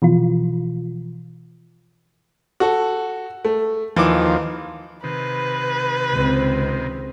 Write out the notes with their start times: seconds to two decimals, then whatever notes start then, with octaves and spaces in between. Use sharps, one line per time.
0.02 B2 E3 F3 F4
2.60 F#4 A4
3.45 A3
3.96 D#2 E3 F3 D6
5.04 C3 D#3 B4
6.12 C#2 C4